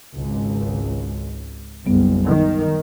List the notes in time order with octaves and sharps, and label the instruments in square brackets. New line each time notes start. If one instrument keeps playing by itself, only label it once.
[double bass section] G#1 C#2
[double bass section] F#1 B1 [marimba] G3 B3
[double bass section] D#3